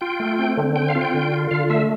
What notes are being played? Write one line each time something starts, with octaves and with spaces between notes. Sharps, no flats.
F4 G5
A3
C4
D3
C4 G5
F5
F4
G5
D3
F4
D3 F5
A3 E5